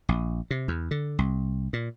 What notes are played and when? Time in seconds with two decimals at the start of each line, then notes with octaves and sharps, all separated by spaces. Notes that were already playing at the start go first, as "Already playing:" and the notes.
0.09 A#1
0.51 C3
0.68 E2
0.91 D3
1.19 C2
1.73 A#2